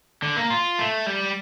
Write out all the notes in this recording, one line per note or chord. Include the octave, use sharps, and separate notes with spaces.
D3
A#3
F4
A3
G3